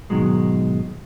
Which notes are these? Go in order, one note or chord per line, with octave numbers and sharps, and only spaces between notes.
G#2 B2 D#3 F#3 G#3